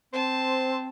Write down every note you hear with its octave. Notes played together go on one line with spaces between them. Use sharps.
C4 C5 A5